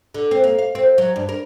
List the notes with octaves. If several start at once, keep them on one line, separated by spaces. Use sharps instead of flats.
D3
C4
A#3
F5
C4
F#3
G2
A#4